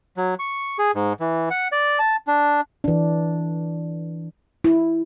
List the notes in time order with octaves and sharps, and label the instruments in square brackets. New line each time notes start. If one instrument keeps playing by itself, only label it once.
[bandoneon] F#3
C#6
G#4
G#2
E3
F#5
D5
A5
D4
[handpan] E3 D4
E4